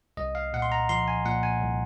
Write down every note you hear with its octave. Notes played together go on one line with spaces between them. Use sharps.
C2 D#5
F5
A#2 F#5
C6
A#5
F3 C6
G#5
A#2 F#5
G#5
C2